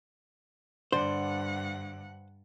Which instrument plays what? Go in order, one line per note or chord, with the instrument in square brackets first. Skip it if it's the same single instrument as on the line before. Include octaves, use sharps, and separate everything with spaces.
[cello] G2 F#5 [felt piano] D3 D5 [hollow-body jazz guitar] C5